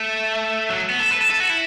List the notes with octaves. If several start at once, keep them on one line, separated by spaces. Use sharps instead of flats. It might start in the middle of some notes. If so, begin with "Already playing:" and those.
Already playing: A3
F#3
B3
A4
B4
A4
A4
F#4
E4